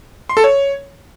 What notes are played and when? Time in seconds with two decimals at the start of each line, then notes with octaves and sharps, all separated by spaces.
0.29 C6
0.37 A4
0.44 C#5